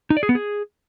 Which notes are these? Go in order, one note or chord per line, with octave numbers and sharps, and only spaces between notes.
D#4
D5
G#4
B3
G#4